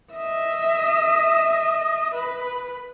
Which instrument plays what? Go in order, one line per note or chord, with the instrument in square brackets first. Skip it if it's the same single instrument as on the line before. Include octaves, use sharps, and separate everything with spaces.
[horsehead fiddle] D#5 E5
B4